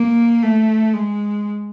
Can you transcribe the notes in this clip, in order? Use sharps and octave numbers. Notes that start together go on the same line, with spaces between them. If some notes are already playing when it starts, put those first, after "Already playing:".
Already playing: A#3
A3
G#3